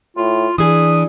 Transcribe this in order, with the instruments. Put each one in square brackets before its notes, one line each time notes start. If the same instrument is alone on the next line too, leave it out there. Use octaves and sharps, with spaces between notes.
[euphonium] A2 [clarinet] F4
[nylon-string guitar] E3 G#4 [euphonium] D4 [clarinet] D#6